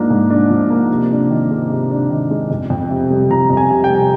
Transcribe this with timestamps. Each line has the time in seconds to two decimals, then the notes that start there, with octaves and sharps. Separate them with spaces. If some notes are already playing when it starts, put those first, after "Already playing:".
Already playing: G#2 F3 A#3 D4
0.10 G#2
0.30 D4
0.50 F3
0.70 A#3
0.91 C3
1.10 D4
1.30 D#3
1.51 G#3
1.70 C3
1.91 D4
2.10 D#3
2.31 G#3
2.51 F2
2.70 F2
2.91 C3
3.10 G3
3.30 F2 A#5
3.50 F2
3.57 G#5
3.70 C3
3.84 G5
3.90 G3